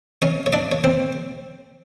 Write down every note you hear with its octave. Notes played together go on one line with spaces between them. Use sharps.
C#4 C#5
C#5
D4 D5
C#5
C4 C5